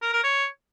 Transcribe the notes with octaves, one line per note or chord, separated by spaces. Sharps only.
A#4
A#4
C#5